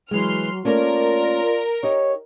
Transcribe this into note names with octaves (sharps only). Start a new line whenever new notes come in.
E3 F#3 G#3 C6 F6
A3 A#3 C#4 F4 A#4 D5
D#4 G4 C#5 D#5